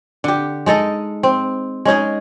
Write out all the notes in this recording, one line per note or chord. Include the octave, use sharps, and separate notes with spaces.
D3 G4
G#3 D#4 A4 D#5
C4
G#3 C#4 D#4 G#4